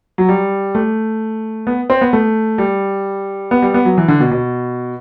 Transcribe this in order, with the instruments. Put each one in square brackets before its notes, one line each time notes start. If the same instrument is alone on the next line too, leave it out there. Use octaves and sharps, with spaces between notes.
[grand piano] F#3
G3
A3
B3
C4
B3
A3
G3
B3
G3
B3
F#3
E3
D3
B2
B2